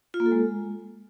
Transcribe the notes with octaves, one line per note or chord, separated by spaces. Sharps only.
F4
A#3
A4
G#3